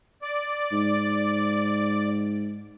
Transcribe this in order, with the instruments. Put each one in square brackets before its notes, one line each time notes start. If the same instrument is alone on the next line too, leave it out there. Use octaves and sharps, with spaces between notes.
[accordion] D5
[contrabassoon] G#2